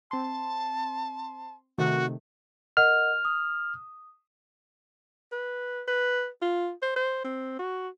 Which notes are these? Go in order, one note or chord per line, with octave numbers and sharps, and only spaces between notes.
C4 A5 C6
C3 D#3 A3 F#4
A#4 D#5 F#5 F6
D#6
B4
B4
F4
C5
C5
C4
F#4